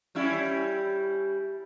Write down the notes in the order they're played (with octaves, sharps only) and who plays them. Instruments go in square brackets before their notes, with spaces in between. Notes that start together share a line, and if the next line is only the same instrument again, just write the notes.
[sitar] G3 C#4 E4